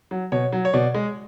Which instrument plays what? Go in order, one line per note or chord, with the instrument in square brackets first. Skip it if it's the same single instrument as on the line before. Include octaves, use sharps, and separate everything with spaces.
[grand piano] F#3
B2 C#5
F#3
C#5
B2 D5
G#3